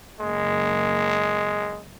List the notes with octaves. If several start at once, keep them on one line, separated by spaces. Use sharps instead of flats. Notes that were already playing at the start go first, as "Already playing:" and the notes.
F#1 G#3 A#3